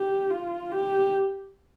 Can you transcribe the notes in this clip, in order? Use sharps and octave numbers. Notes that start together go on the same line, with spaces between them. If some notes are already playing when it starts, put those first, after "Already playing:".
Already playing: G4
F4
G4